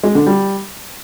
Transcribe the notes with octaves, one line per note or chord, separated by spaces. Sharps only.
G#3
D3
G3